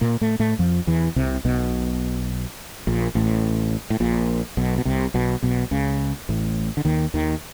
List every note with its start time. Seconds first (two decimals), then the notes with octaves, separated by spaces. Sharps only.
0.01 A#2 A#3
0.21 A2 A3
0.39 A2 A3
0.59 F2 F3
0.87 E2 E3
1.16 C2 C3
1.45 B1 B2
2.87 A#1 A#2
3.15 A1 A2
3.90 A2
4.00 A#1 A#2
4.57 B1 B2
4.78 B2
4.85 C2 C3
5.14 B1 B2
5.42 B1 B2
5.71 C#2 C#3
6.29 A1 A2
6.77 D3
6.85 D#2 D#3
7.14 D#2 D#3